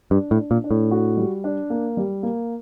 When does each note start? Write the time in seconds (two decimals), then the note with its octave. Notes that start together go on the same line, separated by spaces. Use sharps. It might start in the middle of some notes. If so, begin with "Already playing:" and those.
0.11 G2 D4
0.31 A2
0.38 D4
0.51 A#2
0.64 D4
0.71 A2
0.91 F#4
1.17 G3
1.44 D4
1.70 A#3
1.97 G3
2.23 A#3